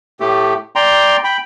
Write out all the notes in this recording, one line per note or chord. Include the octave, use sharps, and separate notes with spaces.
A2 A3 G4
D5 G5 A#5 C6
G5 B5